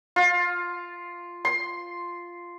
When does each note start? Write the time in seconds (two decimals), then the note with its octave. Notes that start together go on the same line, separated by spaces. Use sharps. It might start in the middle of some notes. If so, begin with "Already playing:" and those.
0.16 F4
1.45 C6